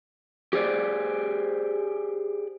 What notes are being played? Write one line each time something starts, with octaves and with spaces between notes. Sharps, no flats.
G4 G#4 C5 D5